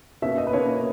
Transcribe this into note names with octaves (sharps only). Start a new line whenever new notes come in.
B2 A#3 C#4 E5
D#5
B4
B2 A#3 C#4 C#5